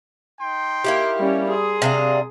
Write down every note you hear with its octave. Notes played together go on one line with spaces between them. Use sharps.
D#4 G5 C6
A#3 E4 G4
G3 C#4
G#4 A#4 C6 D#6
C3 D4 F5